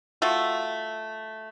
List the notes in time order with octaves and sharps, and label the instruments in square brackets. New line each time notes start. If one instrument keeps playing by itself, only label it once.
[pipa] A3 F4 F#4